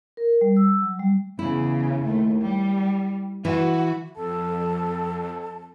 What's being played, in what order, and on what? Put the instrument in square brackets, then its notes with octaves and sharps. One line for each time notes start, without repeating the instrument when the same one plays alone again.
[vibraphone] A#4
G3
E6
F#3
G3
[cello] E2 C#3 [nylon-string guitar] E4
[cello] D#2 A3
G3
[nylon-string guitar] E3 [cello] F#4
[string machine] F2 [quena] A4 [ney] A5